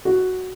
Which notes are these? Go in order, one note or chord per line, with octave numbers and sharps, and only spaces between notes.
F#4